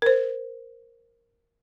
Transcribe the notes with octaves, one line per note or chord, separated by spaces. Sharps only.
A#4 C5